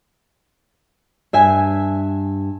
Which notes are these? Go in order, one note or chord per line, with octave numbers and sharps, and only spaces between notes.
G2 E5 G#5